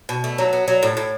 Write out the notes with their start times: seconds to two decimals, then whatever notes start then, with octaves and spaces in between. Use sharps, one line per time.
0.09 B2
0.24 A3
0.38 F#3
0.53 B3
0.68 F#3
0.83 A2
0.97 A2